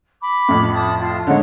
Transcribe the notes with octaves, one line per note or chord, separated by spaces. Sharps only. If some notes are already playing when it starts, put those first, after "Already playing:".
B5 D6
F2 A2
A5 D#6
F4 A5
D3 G#3 D#4 C#5 F#5